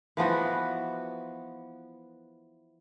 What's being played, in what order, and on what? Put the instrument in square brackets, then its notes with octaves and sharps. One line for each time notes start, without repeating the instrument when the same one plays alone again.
[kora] E3 F3 B3 F#4